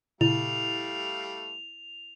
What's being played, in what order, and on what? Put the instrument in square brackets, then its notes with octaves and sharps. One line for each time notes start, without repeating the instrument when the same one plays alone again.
[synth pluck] A#2 C#3 [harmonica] G3 A3 F5 [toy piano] E4 [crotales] F7